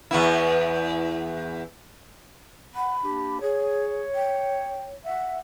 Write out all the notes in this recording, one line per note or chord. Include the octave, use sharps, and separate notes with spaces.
E2 B3 E4
F#5 B5
A#3 D4 G4
G#4 C#5
G5
E5 F#5